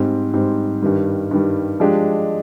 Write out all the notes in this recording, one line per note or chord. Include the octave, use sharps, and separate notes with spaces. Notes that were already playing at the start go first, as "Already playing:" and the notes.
Already playing: G#2 G3 C4
G#2 G3 C4
G2 D#3 G3
G2 D#3 G3
F3 G#3 D4 G4